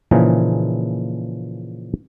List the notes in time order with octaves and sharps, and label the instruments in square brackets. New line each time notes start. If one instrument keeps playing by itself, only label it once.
[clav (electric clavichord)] A#2 C#3 E3 F3 D#4 G#4